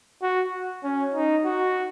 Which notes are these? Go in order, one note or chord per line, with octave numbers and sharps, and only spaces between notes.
F#4
C#4
D#4
F#4